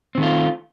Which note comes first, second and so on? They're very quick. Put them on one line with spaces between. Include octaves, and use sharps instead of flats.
C4 D#3 A3 F4